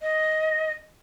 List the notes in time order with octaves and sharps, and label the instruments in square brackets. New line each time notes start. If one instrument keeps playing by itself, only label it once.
[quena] D#5